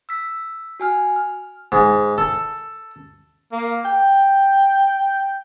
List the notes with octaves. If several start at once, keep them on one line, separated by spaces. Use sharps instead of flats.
E6 B6
F#4 G#5 F6
F6
G#2
A4
A#3
G5